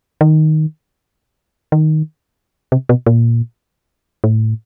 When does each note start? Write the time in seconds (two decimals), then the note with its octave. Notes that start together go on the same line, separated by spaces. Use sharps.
0.21 D#3
1.72 D#3
2.72 C3
2.89 B2
3.07 A#2
4.24 A2